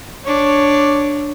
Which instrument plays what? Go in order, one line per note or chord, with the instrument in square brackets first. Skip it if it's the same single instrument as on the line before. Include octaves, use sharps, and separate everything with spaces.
[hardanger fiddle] D4 C#5